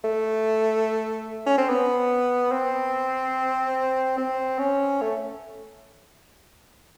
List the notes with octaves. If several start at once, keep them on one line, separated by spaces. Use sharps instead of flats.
A3
C#4
C4
B3
C4
C4
C#4
A3